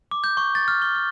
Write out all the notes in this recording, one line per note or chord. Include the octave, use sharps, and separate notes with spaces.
D6
G6
C#6
A6
F6
G7
F6